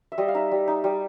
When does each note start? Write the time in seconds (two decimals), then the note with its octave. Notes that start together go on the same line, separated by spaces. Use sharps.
0.12 E5
0.18 G3 D#5
0.28 F5
0.34 D#4 E5
0.52 G3
0.68 D#4
0.84 G3